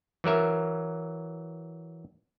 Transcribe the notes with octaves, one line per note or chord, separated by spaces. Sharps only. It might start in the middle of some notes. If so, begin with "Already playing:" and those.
E3 F#3 A#4 E5